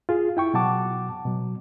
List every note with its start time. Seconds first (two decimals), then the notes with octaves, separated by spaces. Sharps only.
0.09 F4 G#4
0.37 E4 G5 C#6
0.54 B2 F#3 F#5 A5 D6
1.25 B2 F#3